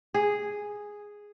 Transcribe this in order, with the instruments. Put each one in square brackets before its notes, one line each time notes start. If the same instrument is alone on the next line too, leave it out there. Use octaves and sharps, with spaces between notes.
[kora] G#4